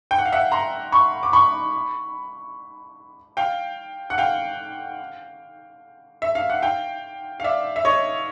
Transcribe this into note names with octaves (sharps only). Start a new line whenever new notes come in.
G5
F#5
F5
E5 F#5
A#5 C6
B5 C#6
D6
B5 C#6
F5 G5
F#5
F5 G5
E5
F5
F#5
F5 G5
F5
D5 E5
E5
C#5 D#5